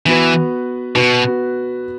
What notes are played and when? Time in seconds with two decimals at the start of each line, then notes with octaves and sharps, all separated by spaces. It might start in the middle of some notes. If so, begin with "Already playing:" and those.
0.06 E3 B3 F#4 B4
0.95 B2 B3 F#4 B4